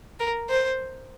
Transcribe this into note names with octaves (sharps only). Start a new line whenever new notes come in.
A#4
C5